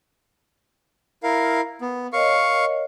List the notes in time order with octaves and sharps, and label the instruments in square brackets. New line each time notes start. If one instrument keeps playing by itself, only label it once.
[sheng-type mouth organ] E4 A#4 F5
B3
[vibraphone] A#4 C#5 D#5 [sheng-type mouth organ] F5 C#6